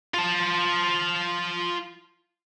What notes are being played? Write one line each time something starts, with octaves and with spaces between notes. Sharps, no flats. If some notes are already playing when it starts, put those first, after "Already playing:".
F4 A5